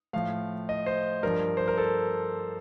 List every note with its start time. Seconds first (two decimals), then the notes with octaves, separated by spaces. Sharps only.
0.13 A2 F3 F5
0.69 D#5
0.86 C5
1.23 G2 F3 A#4
1.57 C5
1.68 A#4
1.78 A4